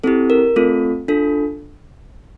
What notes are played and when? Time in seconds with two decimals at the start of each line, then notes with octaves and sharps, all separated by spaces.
0.04 C4 E4 G4 A4
0.30 A#4
0.56 A3 C4 F4 A4
1.08 D4 F4 A4